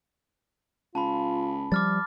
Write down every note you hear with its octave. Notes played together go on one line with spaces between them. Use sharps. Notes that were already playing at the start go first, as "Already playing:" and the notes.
C#2 F4 A5 B5
F3 G3 D6 F6 A6